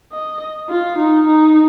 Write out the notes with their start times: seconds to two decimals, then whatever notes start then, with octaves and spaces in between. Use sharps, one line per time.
0.12 D#5
0.70 F4
0.99 D#4
1.28 D#4